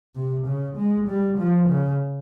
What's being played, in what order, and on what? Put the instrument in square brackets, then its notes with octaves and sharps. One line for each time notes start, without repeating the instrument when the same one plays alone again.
[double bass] C3
C#3
G#3
G3
F3
C#3